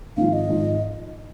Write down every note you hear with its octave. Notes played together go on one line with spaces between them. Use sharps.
G#1 G#2 F3 F5
D#5
G#1 G#2 F3